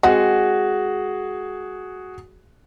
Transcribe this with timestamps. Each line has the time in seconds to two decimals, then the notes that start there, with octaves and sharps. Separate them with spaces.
0.03 G#3 C4 F#4 G#4 F#5